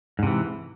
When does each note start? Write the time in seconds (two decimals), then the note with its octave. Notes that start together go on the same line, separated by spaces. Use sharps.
0.19 G#2
0.23 C3
0.27 E3